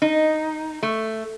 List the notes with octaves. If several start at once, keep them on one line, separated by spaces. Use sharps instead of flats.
D#4
A3